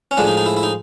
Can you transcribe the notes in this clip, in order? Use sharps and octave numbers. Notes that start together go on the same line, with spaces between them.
C#4
A2 F3 G#3 D4
D#4
D#4
E4
E4
D#4